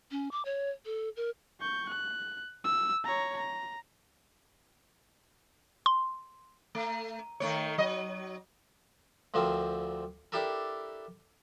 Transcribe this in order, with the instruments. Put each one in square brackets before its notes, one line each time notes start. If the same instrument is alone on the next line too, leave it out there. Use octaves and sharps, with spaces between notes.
[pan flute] C#4
D6
C#5
A4
A#4
[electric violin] C#6 G6
F#6
E6
C#5 A#5
A#5
[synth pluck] C6
[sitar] A3
D#3 A3 C#5
F#3 D#5
[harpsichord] D2 D3 F3 C4 A#4
D4 E4 G4 A4 A#4